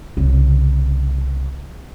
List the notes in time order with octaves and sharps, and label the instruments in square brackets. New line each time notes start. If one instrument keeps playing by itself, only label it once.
[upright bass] C2 C#3